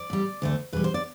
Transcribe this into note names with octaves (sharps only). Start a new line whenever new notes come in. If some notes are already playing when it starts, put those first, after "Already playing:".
Already playing: D5
A2 G3
D2 D3 A3
E2 B2 G3 B4
C5
D5